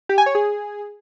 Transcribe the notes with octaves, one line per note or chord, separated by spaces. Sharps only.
G4
G#5
C#5
G#4